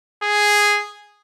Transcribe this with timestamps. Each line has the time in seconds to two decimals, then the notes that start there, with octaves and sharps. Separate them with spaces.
0.23 G#4